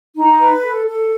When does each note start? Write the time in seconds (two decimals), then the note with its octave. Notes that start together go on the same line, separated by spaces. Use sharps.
0.16 D#4
0.40 B4
0.63 A4
0.86 A4